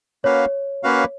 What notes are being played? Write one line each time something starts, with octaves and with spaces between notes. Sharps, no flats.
A#3 C#4 F#4 B4 C#5 F5
A#3 C#4 F#4 B4 F5